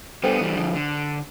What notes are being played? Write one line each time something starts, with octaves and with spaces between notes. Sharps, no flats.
G3 B3 D4 A4 C5 G5
E3 G3
D3 F3
D3